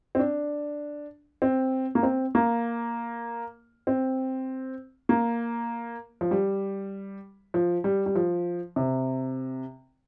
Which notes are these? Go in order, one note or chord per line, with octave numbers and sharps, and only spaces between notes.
C4
D4
C4
A#3
C4
A#3
C4
A#3
F3
G3
F3
G3
G3
F3
C3